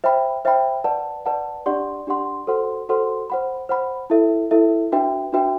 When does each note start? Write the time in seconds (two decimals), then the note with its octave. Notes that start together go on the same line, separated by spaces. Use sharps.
0.04 C5 E5 G5 B5
0.45 C5 E5 G5 B5
0.84 B4 D5 F#5 A5
1.26 B4 D5 F#5 A5
1.66 D4 G4 D5 F#5 C6
2.07 D4 G4 D5 F#5 C6
2.47 F#4 A4 C5 F#5 C6
2.89 F#4 A4 C5 F#5 C6
3.30 C5 F#5 B5
3.69 C5 F#5 B5
4.10 E4 A4 E5
4.51 E4 A4 E5
4.92 D4 F#4 B4 E5 G5
5.33 D4 F#4 B4 E5 G5